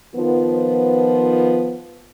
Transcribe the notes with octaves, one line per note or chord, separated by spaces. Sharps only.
D#3 F3 B3